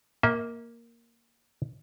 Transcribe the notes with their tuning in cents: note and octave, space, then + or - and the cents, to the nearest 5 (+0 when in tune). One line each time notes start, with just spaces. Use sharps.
A#3 +0 E5 -40